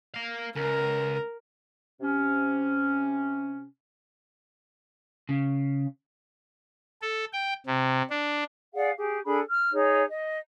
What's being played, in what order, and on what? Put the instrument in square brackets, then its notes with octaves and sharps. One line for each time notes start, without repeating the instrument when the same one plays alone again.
[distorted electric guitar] A#4 F5
[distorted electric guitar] C#2 [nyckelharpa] A#4
[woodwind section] C3 C#4
[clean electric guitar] C#3
[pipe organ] A4
G5
C3
D4
[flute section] G#4 D5 F5 F#5
G4 G#4
D4 G#4 A4 B5
F6
D#4 G#4 C#5
D#5